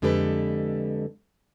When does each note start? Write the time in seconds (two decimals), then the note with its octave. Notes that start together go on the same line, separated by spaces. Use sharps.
0.02 F2 D3 G#3 G4 A4 B4